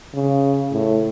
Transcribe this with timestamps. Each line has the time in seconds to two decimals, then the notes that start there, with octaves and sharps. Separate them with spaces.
0.14 C#3
0.72 A2